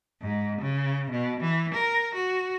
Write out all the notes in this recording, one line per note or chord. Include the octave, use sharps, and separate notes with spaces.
G#2
C#3
B2
E3
A#4
F#4